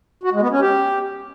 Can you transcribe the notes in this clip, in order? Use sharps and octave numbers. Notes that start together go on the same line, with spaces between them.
F#4
G#3
B3
C#4
G4